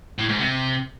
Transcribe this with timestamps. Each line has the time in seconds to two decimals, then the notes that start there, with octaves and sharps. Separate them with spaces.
0.18 A2
0.29 G#2
0.39 C3